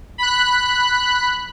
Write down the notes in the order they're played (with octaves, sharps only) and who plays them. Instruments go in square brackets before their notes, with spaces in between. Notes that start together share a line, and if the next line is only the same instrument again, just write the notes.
[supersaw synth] B5 F#6